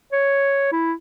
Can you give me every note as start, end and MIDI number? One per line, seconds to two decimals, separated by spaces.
0.12 0.68 73
0.72 0.93 64